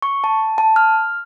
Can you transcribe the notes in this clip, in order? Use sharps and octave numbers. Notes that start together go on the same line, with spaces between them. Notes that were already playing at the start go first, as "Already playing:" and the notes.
C#6
A5
A5
F6